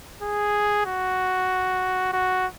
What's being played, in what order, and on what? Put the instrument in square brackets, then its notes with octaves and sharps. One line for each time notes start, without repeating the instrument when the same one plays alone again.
[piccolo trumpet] G#4
F#4
F#4